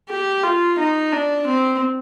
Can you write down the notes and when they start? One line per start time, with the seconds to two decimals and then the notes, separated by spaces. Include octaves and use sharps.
0.09 G4
0.43 F4
0.78 D#4
1.12 D4
1.47 C4